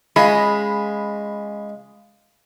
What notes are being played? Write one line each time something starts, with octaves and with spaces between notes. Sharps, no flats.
G#3 C#4 F4 B5